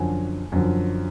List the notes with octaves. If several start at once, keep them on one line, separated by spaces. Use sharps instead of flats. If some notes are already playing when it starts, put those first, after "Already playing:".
Already playing: F#2 D3 F3 G#5
F#2 D3 F3